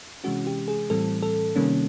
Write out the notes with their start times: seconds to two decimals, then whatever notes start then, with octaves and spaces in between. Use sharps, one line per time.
0.24 C3 E3 G#3 C#4 F#4
0.47 G4
0.68 G#4
0.90 A2 E3 G3 C4 A4
1.22 A4
1.56 C3 D#3 G3 A#3 C#4